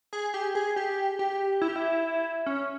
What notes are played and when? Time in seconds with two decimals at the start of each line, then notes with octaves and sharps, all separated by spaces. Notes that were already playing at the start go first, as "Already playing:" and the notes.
0.13 G#4
0.34 G4
0.55 G#4
0.76 G4
1.19 G4
1.61 E4
1.68 G4
1.76 E4
2.46 C#4